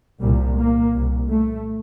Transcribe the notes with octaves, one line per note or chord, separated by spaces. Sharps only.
C2 A#2 G3
A#3
C2 A#2
A3